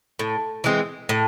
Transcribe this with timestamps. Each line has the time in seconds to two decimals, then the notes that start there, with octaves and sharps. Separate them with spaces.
0.19 A2
0.64 E3 G#3 C4
1.09 A2